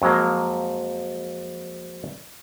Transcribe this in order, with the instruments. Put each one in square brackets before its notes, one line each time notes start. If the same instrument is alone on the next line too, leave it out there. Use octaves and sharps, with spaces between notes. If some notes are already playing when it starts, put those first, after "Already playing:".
[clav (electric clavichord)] F2 F#3 G#3 A#3